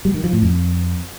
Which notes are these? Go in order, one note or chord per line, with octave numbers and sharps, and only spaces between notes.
G3
D#3
F3
A2
F2